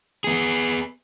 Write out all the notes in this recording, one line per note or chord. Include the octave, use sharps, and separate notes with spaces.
B3 G#4